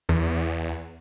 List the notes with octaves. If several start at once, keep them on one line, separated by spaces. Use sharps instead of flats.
E2